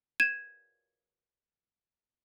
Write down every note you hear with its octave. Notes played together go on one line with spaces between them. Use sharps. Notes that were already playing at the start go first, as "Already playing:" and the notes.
G#6 D#7 E7